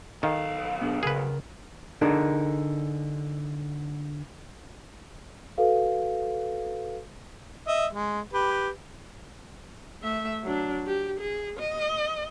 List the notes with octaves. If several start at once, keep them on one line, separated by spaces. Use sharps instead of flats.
B1 D#3 A4 F5
B3 D4 G#4
C#3 G#4 A#4 B4
D3 D4 D#4 G#4 A#4
F#4 A4 B4 F5
D#5 E5
G#3
G4 B4
A3 E5
F#3 D4
G4
G#4
D#5